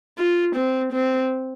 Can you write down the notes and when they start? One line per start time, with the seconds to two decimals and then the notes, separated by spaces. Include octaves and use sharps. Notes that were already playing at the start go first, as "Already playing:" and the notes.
0.18 F4
0.56 C4
0.93 C4